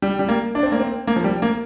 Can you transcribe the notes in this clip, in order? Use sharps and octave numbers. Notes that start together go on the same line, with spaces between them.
G3
G3
A#3
D4
C4
A#3
C4
A#3
F3
G3
A#3